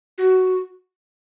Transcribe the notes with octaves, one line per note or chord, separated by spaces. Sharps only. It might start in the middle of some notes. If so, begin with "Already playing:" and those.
F#4